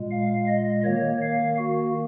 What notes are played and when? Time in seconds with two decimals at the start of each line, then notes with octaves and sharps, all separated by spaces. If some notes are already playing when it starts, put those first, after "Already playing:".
Already playing: A#2 G#3
0.11 F5
0.48 D#5
0.84 D#3 A#3 C#5
1.22 F5
1.59 F#4